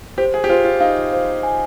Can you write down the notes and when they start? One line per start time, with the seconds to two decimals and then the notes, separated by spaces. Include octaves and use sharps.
0.18 G4 C5
0.34 G#4
0.44 G4
0.49 F4 C5
0.65 F4
0.80 D#4 F5
1.13 C5
1.43 G#5